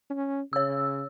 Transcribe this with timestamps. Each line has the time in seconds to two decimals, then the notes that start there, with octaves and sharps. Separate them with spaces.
0.10 C#4
0.53 C#3 C#5 E6